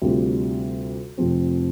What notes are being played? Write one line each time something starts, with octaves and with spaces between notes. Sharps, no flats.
D2 C3 G3 F4
F1 F2 F3 C4